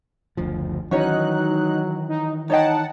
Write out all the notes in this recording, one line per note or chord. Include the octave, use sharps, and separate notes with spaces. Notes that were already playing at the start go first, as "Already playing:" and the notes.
F#1 D2 F3
D#3 E3 F#3 C#4 D#4 F#4 C#5 F#6
D#4
D#4 C#5 D#5 F#5 G5 A5